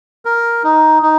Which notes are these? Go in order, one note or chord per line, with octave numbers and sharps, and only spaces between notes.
A#4
D#4
D#4